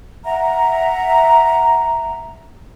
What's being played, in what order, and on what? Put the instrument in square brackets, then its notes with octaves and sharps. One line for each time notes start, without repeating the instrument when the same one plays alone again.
[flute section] E5 F#5 A#5